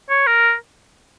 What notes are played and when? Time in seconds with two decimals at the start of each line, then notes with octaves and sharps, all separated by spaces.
0.10 C#5
0.27 A#4